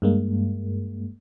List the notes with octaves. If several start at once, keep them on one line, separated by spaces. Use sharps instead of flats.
G2 G#3 A#3